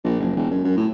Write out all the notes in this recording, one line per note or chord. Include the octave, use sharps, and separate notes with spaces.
A#1
F#1
E1
F#2
F#2
A2